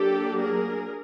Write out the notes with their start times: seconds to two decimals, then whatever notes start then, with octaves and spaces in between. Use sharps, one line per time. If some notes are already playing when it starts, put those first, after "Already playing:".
Already playing: F#3 A#3 D4 G4 A4
0.41 G#4 A#4